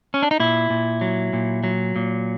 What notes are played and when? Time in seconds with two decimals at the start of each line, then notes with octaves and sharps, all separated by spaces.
0.14 C#4
0.23 D4
0.31 D#4
0.40 A#2 E4
0.70 A#2
1.01 F#3
1.33 A#2
1.64 F#3
1.96 A#2